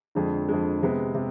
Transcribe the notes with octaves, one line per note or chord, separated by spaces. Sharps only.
F2 D3 G#3
F2 D3 G#3
C3 G#3 B3
C3